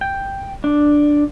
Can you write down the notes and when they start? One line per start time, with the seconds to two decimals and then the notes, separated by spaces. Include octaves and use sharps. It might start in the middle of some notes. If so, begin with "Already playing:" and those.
0.01 G5
0.64 D4